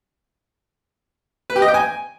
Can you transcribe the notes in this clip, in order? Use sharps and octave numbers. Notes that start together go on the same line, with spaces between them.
B4
G4
D#5
G5
G#5